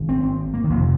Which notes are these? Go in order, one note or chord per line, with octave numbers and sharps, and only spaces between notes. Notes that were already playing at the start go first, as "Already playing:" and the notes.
Already playing: G#1 G#2
C4
C4
A#3
D#3
F1 F2 C3 F3